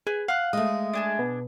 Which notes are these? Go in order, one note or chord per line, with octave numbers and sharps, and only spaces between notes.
G#4 B4
F5 F#5 F#6
G#3 A3 D#6
D4 G#4 A5
B2